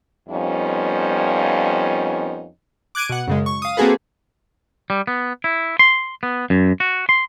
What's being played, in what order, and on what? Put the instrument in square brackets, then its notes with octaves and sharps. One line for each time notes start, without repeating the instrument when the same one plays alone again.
[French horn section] F2 F3 G3 B3 C#4 D#4
[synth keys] D6 F#6 G#6 D7 D#7
B2 F#5
F#2 C#3 G#3
C#6
F5 D#6
A#3 C4 F#4 G#4 A4 B4
[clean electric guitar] G3
B3
E4
C6
B3
F#2
F#4
C6